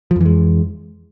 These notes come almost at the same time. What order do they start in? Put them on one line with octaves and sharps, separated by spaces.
F3 F2 E3 G#3